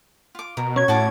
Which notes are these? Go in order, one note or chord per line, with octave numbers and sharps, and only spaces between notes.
F4 D6
B2 A#4
C#4 C#5 G#6
A2 F#4 A5 D6